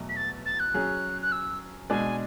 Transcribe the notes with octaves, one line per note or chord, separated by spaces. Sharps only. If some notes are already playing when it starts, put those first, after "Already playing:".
Already playing: E2 B2 F#3 A3
B6
A6
A6
F#6
F#3 C#4 G#4
F#6
E6
B2 G#3 D4 G#4 G#5